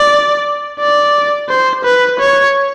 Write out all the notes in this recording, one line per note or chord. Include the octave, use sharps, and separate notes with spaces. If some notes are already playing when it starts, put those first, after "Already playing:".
Already playing: D5
D5
C5
B4
C#5